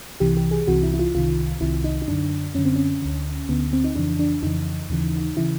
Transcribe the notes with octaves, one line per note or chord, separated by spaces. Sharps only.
C2 C3 E3 G4
G4
G#4
C2 C3 E3 F#4
E4
E4
F4
C2 C3 D#3 F4
C2 C3 D#3 E4
D#4
D#4
F#2 D3 D4
F#2 D3 C#4
C4
C#4
D2 D3
D2 D3 B3
C4
D#4
F2 C#3 E3 D4
D4
F2 C#3 E3 D#4
D#2 C#3 E3
C#3 E3 E4